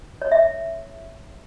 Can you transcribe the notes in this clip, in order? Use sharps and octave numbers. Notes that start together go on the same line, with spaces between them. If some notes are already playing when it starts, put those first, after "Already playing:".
C#5
E5